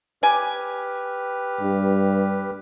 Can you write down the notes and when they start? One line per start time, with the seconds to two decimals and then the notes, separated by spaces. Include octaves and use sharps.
0.23 G4 B4 D5 G#5 F6
1.61 G2